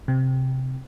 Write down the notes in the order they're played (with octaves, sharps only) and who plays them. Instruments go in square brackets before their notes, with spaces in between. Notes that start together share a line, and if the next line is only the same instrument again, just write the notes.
[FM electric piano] C3